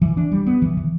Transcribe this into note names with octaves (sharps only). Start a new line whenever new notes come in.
E3
D4
G3
B3
E3
E3